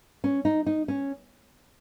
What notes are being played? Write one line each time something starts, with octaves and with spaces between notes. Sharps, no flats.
C#4
D#4
D#4
C#4